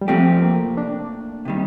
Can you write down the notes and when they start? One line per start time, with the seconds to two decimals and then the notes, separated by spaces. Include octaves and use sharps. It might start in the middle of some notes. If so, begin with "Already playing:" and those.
0.01 G3
0.08 F2 C3 F3 A3 C4 G4
0.42 A#3
0.77 D4
1.45 C3 D#3 G3